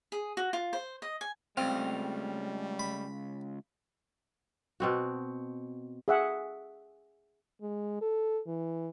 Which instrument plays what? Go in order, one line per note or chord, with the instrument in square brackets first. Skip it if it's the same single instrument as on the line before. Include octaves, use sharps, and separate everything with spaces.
[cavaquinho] G#4
F#4
F4
C5
D#5
G#5
[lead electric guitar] C#2 [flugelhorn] G3 [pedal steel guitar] A3 F5 [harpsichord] C4
[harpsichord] B5
[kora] B2 C4 F#4
[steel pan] G#4 E5 F#5
[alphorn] G#3
A4
E3